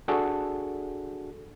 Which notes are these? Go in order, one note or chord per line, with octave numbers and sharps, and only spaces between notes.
D4 F#4 G#4 A4